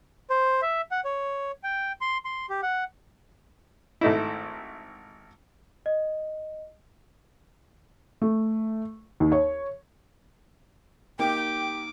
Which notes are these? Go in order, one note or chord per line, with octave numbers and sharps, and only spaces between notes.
C5
E5
F#5
C#5
G5
C6
C6
G4
F#5
G#1 A3 D#4 E4
D#5
A3
D#2
C#5
A#3 D#4 G4 G5 D6